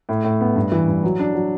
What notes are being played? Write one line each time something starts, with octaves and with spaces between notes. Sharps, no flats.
A2
A2
B3
G2
E3
G2
F#3
D4
F#3